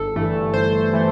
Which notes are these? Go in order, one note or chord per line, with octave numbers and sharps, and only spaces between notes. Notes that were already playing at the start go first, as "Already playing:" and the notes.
Already playing: G1 A4
G2 E3 A3
G1 C5
E3 A3